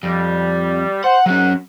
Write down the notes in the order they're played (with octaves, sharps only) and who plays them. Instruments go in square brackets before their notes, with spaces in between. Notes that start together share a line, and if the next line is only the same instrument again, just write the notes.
[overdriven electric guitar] F2 [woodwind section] G3
[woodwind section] C5 [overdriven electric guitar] F#5
[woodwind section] G#2 F#5 [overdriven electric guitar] F#3 C#4